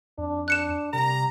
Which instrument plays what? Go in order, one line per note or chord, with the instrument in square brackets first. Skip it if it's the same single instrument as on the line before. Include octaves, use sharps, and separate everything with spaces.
[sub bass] F2 [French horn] D4
[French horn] D4 [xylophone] F#6 C#7 E7
[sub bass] C3 [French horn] G3 [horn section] A#5